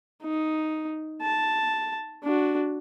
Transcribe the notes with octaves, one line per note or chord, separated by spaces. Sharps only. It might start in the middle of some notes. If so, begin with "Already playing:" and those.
D#4
A5
D4 F#4